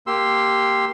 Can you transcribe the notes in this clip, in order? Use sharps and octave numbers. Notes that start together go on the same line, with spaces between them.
A#3 G4 C6 E6